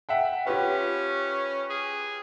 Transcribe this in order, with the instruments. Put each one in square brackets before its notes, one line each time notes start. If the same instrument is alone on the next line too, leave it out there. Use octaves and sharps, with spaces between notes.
[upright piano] E5 F#5 G5
[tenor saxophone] C#4 [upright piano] F4 G4 B4
[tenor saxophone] G#4